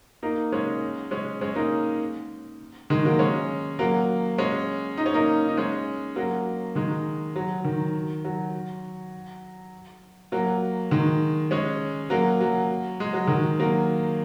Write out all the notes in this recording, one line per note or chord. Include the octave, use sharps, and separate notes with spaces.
A#3 D#4
G#3 C#4
G#3 C#4
G#3 C#4
A#3 D#4
D#3 G#3
F#3 A#3
G#3 C#4
F#3 A#3
G#3 C#4
D#4
C#4
A#3 D#4
D#4
G#3 C#4
F#3 A#3
D#3 G#3
F#3
D#3
F#3
F#3 A#3
D#3 G#3
G#3 C#4
F#3 A#3
F#3
G#3
F#3
D#3 G#3
F#3 A#3